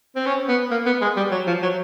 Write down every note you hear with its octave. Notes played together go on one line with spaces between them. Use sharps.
C4
C#4
B3
A#3
B3
G#3
G3
F#3
F3
F#3